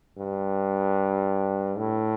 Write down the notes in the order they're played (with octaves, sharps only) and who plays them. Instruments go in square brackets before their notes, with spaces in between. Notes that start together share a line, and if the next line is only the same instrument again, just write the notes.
[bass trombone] G2
A2